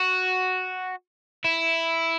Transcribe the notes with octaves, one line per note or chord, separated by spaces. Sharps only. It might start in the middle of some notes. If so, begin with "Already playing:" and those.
Already playing: F#4
E4